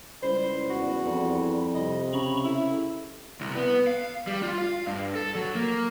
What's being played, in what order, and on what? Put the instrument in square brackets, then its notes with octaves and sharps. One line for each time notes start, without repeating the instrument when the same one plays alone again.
[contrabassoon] C#2 [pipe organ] G3 E4 [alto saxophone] C5
[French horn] E2 [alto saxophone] F#4
[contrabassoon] F2
[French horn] C3 [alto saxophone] D#5
[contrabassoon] C#3 [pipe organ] A#5 B5 C#6
[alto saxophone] E4 [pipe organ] A4
[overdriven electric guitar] C2
B3
F5
G3
F4
F5
G2
A4
F#3
A#3